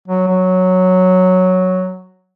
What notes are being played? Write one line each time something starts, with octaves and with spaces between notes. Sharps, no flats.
F#3
F#3